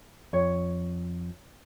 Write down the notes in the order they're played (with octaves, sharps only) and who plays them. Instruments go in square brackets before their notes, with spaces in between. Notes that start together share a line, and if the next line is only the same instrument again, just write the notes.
[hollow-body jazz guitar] F2 [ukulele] C#5